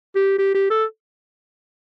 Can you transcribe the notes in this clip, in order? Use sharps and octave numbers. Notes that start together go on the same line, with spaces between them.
G4
G4
G4
A4